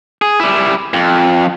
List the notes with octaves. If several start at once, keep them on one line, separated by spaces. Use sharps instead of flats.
G#4
G3 E4
F2